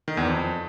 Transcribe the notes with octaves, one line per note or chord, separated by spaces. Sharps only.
D#3
E2
F2